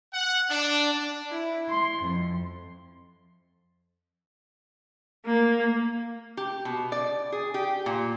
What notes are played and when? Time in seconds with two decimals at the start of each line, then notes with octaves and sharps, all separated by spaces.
0.14 F#5
0.49 D4
1.32 E4
1.70 C6
2.02 F2
5.26 A#3
6.37 G4
6.65 B2
6.92 D5
7.32 G#4
7.54 G4
7.86 A#2